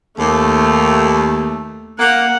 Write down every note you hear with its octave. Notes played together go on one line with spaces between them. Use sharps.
D#2 A3
A#3 F#5